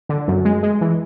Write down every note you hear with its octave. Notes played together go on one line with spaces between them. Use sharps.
D3
F#2
G#3
G#3
E3